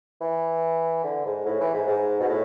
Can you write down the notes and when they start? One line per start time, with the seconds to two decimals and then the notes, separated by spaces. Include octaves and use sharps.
0.21 E3
1.04 D3
1.25 G#2
1.46 A2
1.60 E3
1.74 G#2
1.87 G#2
2.20 B2
2.30 A2